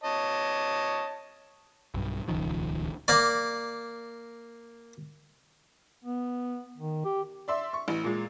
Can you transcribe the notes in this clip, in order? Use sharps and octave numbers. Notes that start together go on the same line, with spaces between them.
C#5 D#5 A5
B1 G2
D#1 C#2 D#3 F3
A#3 D5
B3
D#3
G4
D5 E5 C6
C#6
A1
A#2 G#3